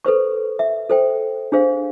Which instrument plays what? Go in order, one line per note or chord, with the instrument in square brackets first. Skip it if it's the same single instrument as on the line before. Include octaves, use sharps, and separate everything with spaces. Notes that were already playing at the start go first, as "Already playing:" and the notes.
[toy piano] A4 B4 C5 C#6
E5
A4 C5 G5
D4 G#4 C5 F5